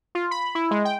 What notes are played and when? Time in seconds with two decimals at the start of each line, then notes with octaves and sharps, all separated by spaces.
0.15 F4
0.31 B5
0.55 E4
0.71 G#3
0.85 G5